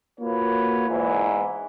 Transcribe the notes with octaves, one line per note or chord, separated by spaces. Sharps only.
A#3 F4 F#4 A#4 B4 C#5
E2 G#2 E3